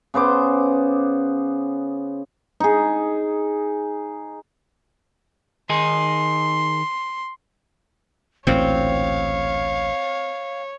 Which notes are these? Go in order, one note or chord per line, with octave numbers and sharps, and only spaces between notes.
C#3 B3 C5 D6
D#4 G#4
D#3 D#4 G#4 C6
A1 D2 A#2 C4 C#5 F5